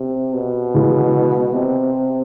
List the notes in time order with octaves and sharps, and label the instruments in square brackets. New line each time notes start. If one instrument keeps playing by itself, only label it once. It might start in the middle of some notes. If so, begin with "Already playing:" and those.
Already playing: [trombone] C3
B2
[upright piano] C#3 E3 G#3
[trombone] C3